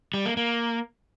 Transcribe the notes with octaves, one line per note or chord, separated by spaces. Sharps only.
G3
A#3
A#3